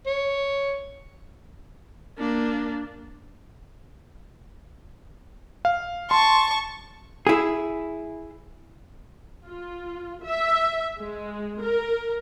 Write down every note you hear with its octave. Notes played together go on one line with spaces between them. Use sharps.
C#5
A#3 D4
F5
A5 C6 C#6
E4 G#4
F4
E5
G#3
A#4